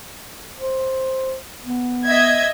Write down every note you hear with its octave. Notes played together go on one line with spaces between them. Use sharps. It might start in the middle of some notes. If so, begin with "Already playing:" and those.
C5
B3
D#5 E5 G#6